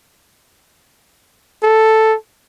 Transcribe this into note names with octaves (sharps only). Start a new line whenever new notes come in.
A4